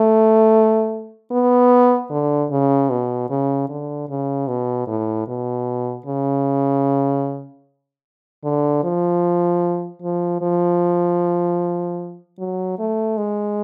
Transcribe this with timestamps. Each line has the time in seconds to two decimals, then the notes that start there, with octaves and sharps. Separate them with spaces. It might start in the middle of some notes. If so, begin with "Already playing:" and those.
Already playing: A3
1.31 B3
2.10 D3
2.51 C#3
2.90 B2
3.30 C#3
3.69 D3
4.09 C#3
4.48 B2
4.87 A2
5.28 B2
6.06 C#3
8.44 D3
8.83 F3
10.02 F3
10.42 F3
12.39 F#3
12.79 A3
13.17 G#3